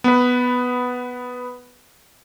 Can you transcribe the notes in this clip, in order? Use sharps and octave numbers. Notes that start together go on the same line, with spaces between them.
B3 B4